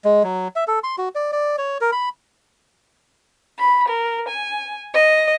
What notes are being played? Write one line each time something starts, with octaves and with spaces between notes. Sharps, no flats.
G#3
F#3
E5
A4
C6
F#4
D5
D5
C#5
A#4
B5
B5
A#4
G#5
D#5